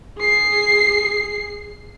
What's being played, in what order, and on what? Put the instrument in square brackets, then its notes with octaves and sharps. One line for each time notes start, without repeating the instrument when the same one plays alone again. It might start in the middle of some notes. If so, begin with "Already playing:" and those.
[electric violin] G#4 C7